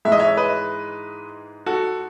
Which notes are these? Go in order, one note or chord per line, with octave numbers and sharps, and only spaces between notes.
G#2 E3 G#3 E5
D#5
C#5 E5
B4 D#5
F#4 A4